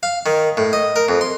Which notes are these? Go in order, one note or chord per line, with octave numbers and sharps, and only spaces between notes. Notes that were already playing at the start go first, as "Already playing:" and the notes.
F5
D#3
A2
D#5
A#4
F2
C6